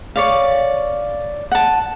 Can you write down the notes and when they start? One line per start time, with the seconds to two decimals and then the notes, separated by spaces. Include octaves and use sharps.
0.16 C#5 D5 F5
1.52 F#5 A5